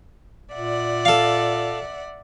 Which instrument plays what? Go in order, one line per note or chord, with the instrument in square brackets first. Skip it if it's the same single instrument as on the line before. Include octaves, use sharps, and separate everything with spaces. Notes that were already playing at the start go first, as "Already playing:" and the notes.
[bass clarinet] A#2 [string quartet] D5 E5 F#5
[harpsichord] A4 F5